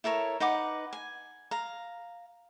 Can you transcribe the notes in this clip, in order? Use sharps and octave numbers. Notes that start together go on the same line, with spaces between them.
E4 A4 A#4 C#5
D#4 B4 F#5 D6
G#5
F5 A#5